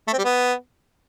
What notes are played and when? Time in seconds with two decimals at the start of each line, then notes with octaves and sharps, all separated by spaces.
0.07 A3
0.13 C4
0.18 G3
0.24 B3